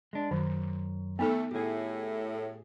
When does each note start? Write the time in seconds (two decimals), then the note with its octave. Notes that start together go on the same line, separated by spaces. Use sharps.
0.13 G#3 D4
0.31 F#2 D#3
1.19 A3 B3 D#4 A4
1.51 A2 G4 G#4